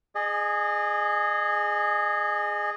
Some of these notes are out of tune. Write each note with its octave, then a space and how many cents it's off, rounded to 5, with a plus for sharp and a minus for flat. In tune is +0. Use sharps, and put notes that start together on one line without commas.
G#4 +0 D#5 -35